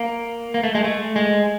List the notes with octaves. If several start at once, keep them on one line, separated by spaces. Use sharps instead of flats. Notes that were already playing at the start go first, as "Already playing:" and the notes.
Already playing: A#3
A#3
A3
G#3
A3
G#3